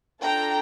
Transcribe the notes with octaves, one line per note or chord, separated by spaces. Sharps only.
D4 F4 A4 G5 A#5